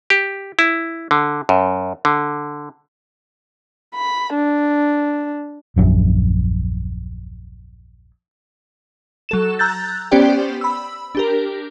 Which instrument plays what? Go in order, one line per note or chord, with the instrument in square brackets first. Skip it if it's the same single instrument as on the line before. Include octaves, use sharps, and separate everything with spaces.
[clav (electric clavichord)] G4
E4
D3
F#2
D3
[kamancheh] B5
D4
[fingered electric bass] D#1 A#1 F#2
[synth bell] F#3 A4 E7
A#5 E6 F#6 G6 A6
B3 C#4 G4 C5 D5 G5
B5 E6
D4 G4 A#4